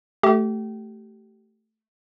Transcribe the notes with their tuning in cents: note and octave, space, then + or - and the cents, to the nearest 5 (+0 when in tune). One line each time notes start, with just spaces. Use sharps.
A3 +0 G4 -30